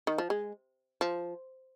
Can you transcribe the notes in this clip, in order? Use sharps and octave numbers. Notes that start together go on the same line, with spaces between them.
D#3
F3
G#3
F3